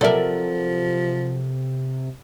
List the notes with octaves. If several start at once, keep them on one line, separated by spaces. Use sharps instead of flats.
C3 F3 F#3 A4 A#4 D5 E5